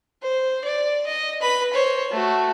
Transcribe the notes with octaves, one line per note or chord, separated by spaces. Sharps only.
C5
D5
D#5
B4 B5
C5 C#5
A3 F#4